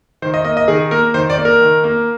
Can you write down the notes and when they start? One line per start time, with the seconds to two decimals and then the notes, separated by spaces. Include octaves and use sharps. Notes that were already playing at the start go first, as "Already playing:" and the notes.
0.22 D#3 C5
0.34 D#5
0.45 A#3 D#5
0.57 D#5
0.68 D#3 G#4
0.91 A#3 A#4
1.14 D#3 C5
1.30 D5
1.38 A#3
1.45 A#4
1.61 D#3
1.84 A#3